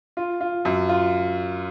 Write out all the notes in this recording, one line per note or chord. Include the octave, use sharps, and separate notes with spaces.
F4
F4
F#2
F4